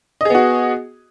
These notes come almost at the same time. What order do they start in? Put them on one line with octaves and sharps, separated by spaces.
D#5 G#4 B3 F#4